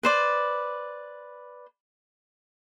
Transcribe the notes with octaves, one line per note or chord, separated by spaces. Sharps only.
B4 C5 D5